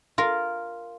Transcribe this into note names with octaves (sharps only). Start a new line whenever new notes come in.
F4 A#4